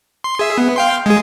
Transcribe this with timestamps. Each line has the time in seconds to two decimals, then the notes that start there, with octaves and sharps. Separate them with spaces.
0.24 C6
0.39 G#4 E5
0.58 B3
0.76 F5 G5 C6
1.06 G#3 G#4